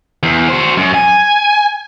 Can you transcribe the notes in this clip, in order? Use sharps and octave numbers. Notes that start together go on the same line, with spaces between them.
E2
F#4 C5
F#2
G#5